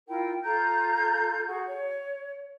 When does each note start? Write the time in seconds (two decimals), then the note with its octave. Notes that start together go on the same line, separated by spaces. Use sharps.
0.07 E4 F4 A#4 G5
0.43 F4 A4 A#5 G6
1.46 F#4 G#4
1.67 C#5